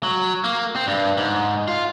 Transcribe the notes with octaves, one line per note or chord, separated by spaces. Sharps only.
F#3
A#3
C4
G2
G#2
F4